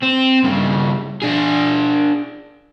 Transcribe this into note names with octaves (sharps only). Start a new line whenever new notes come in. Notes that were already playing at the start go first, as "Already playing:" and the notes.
C4
G2 C#3
D4 G#4